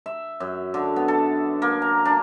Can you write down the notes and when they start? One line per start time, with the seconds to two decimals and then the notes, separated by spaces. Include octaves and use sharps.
0.06 E5
0.40 F#2
0.74 D3
0.96 B3
1.08 A4
1.62 A#3
1.82 A#5
2.05 D4